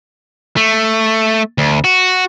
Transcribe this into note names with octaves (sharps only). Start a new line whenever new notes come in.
A3
D2
F#4